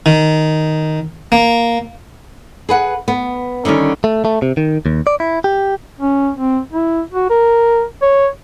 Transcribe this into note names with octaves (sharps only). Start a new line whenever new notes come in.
D#3
A#3
G#4 B4 F#5
B3
D3 D#3 G3 C#4
A3
A3
C3
D#3
D#2
D5
E4
G4
C#4
C4
E4
F#4
A#4
C#5